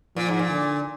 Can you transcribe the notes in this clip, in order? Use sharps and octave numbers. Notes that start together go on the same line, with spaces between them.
A#2 F3
G#2
A#2
D3